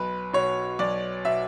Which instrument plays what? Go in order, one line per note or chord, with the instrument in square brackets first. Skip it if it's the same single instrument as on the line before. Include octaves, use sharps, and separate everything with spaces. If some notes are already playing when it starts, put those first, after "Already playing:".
Already playing: [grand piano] B1 B4
B2 C#5
B1 D5
B2 E5